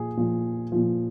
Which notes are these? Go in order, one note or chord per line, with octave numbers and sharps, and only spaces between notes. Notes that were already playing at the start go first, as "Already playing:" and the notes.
Already playing: A#2 F3 G#4
A#2 F3
A#2 F3